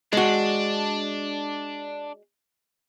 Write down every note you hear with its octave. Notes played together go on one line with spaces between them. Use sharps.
G#3 D4 F#4